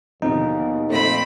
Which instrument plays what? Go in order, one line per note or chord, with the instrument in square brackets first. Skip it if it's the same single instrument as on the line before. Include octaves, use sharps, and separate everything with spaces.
[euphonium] D#2 [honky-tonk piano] B2 D3 F3 [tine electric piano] D#4
[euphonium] F2 [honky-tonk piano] A#2 A3 [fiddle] C4 B5